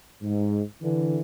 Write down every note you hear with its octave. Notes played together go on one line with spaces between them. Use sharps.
G#2
D3 E3